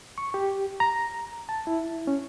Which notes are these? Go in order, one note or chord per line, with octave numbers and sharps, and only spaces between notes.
C#6
G4
A#5
A5
E4
C#4